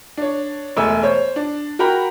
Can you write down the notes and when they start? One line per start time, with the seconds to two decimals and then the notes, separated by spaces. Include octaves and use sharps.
0.17 D4 C#5
0.77 E1 A3 G#5 E6
1.03 C5 C#5
1.36 D4
1.79 F#4 A#4 G5 A#5 B5